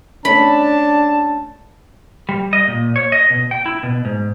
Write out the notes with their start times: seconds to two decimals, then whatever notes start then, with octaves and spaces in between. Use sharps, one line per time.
0.25 A3 C#4 D4 A5 B5
2.29 G3
2.53 D#5
2.68 A#2
2.96 C#5
3.12 D#5
3.30 B2
3.51 G5
3.66 E4
3.83 B2
4.05 G#2